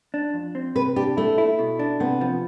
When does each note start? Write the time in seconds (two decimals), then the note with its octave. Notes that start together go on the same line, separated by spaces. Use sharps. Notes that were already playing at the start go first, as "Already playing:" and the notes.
0.14 D4
0.34 F2
0.55 C4
0.76 C3 B4
0.96 D4 G4
1.17 A3 E4
1.38 E4
1.59 B2
1.79 D4
2.00 C3 B3
2.21 F3